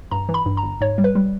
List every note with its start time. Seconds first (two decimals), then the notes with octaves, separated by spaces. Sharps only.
0.11 G2 A#5
0.29 E3
0.34 B5
0.46 G2
0.57 A#5
0.63 G1
0.81 G#2 C#5
0.98 G3
1.04 B4
1.15 G3